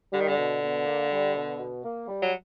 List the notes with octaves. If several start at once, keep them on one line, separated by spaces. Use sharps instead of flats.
D3 G3
D#3
D3
B2
B2
A#3
G3
B2
B2
A#3
G3
F#3